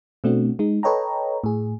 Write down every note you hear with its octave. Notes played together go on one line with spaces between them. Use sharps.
B2 A3 C4 D4 F#4
G#3 D#4
A4 B4 C#5 D#5 G5 A#5
A2 G#4